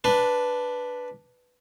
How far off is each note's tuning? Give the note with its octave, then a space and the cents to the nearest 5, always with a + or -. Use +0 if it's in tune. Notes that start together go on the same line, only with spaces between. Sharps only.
D4 +0 B4 +0